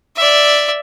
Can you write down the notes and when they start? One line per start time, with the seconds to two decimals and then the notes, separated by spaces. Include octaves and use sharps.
0.16 D5 E5